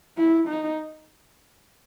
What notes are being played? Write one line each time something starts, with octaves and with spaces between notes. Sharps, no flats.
E4
D#4